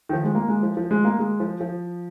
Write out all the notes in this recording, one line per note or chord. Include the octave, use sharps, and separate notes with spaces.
D#3
F3
G#3
A#3
G#3
F3
F3
G#3
A#3
G#3
F3
F3